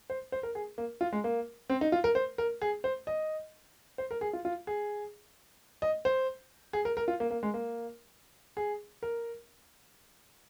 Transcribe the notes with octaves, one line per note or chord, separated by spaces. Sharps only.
C5
C5
A#4
G#4
A#3
F4
G#3
A#3
C4
D#4
F4
A#4
C5
A#4
G#4
C5
D#5
C5
A#4
G#4
F4
F4
G#4
D#5
C5
G#4
A#4
A#4
F4
A#3
A#3
G#3
A#3
G#4
A#4